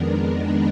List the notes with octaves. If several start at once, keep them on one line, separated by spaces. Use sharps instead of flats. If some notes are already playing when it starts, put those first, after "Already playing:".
Already playing: F2 D#3 G#3 B3 D4 A#4
B4